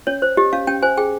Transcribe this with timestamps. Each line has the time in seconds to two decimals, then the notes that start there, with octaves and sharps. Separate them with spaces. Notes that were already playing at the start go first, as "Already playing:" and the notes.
0.07 C#4 C#5
0.22 C5
0.37 G4 D#5
0.53 C#4 F5
0.67 C#4 G5
0.82 C5 G#5
0.97 G#4 G5